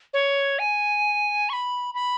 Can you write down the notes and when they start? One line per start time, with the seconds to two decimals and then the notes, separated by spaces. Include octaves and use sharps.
0.14 C#5
0.59 G#5
1.49 C#6
1.53 B5
1.95 B5